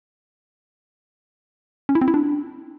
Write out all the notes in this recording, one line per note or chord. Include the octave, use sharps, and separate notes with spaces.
C#4
E4
C4
E4
D4